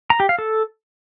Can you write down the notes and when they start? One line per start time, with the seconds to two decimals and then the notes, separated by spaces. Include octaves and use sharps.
0.10 A#5
0.20 G4
0.29 F5
0.39 A4